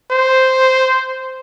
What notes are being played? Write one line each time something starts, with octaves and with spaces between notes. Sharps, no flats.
C5